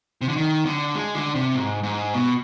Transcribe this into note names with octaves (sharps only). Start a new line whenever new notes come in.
C3
D3
D#3
D3
G#3
D3
C3
G#2
G#2
B2